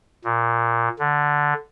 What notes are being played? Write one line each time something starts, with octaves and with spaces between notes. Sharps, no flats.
A#2
D3